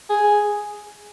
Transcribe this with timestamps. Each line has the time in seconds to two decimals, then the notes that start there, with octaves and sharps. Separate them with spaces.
0.10 G#4